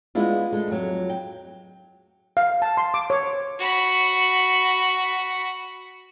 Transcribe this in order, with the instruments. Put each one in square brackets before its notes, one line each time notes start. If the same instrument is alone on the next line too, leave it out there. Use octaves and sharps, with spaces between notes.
[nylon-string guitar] G#3 B3 D4 E4 F4
G#3 A3
F2 F#3
G5
[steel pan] F5
A5
C6
D6
C#5
[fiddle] F#4 B5